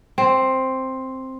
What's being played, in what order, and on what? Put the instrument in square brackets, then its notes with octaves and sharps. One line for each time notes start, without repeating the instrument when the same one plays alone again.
[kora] C4